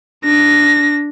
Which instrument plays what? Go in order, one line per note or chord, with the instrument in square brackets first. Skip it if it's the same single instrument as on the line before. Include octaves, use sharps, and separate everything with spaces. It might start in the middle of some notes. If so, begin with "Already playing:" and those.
[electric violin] D4 A#6